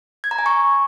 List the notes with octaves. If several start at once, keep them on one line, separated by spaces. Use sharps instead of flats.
G#6
A#5
G#5
C#6